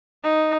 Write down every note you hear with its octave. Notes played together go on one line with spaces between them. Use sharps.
D#4